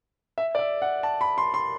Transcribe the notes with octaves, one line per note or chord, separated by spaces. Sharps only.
E5
D5
E5
F#5
A5
B5
C6
C6